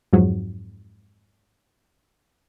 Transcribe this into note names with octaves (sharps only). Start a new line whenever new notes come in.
F2 G#2 F#3